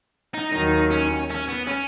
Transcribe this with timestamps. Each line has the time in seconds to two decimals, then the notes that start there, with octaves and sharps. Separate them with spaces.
0.34 D#4
0.53 D#2 D#3 F#3 D#4
0.91 C#4
1.30 C#4
1.48 B3
1.67 C#4